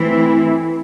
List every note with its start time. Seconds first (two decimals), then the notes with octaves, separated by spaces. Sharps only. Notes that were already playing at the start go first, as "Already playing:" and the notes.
Already playing: E3 A3 C4 E4